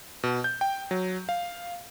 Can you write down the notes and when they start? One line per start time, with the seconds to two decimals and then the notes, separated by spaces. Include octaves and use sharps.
0.23 B2
0.44 G6
0.61 G5
0.91 F#3
1.29 F5